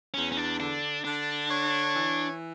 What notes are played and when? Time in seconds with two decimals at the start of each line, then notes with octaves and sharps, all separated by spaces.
0.14 E2 C#4
0.32 C#4
0.37 D4
0.59 D3 D4
1.05 D3 D4
1.50 C#5
1.95 E3